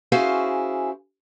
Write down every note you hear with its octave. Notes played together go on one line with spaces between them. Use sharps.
C#4 E4 F#4 G#4 C5 F5